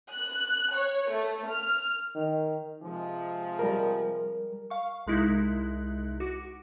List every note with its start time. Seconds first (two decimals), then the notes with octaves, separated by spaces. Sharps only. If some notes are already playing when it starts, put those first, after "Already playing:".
0.12 F#6
0.73 C#5
1.09 A3
1.47 F6
2.15 D#3
2.82 C3 F3 G#3
3.59 G3 A#4
4.70 F5 C#6
5.07 C2 G#3 D#4 E4 F#6
6.20 F#4 D6